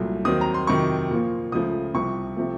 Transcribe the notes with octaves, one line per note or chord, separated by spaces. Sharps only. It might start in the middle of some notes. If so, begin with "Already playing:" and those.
Already playing: C2 A#2 F#3 A3
D#2 D#3 F#3 C4 D#6
A#5
C6
F2 C3 D#3 F#3 C#6
A#2 F3 A#3
C#2 C#3 F3 A3 D#6
C2 C3 F3 C#6
C3 F3 A3